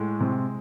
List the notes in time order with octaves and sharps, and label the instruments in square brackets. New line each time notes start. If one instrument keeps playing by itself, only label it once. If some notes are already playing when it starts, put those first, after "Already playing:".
Already playing: [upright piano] A2 G#3
C3